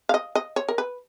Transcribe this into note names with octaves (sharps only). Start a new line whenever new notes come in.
F5
D#5
D#5
C#5
A#4
B4